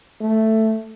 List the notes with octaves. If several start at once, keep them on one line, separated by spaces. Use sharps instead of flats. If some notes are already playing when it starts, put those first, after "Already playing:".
A3